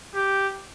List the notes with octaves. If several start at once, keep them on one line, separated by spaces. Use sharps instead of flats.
G4